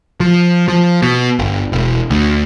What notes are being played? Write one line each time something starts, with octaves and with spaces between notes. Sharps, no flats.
F3
F3
B2
G1
E1
D2